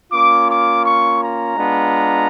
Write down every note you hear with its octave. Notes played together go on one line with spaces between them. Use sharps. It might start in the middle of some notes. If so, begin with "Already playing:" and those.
A#3 C#4 F4 D6
D6
C#6
A#5
G#3 B3 D4 F4